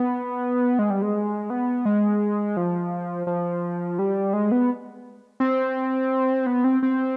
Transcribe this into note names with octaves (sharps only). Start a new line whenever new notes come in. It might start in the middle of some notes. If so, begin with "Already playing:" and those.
Already playing: B3
G#3
G3
G#3
B3
G#3
F3
F3
G3
G#3
B3
C4
B3
C4
C4